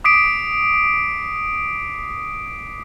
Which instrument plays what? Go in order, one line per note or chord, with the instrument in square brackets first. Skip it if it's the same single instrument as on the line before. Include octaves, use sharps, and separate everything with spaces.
[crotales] D6 D#6 B6 C7 D7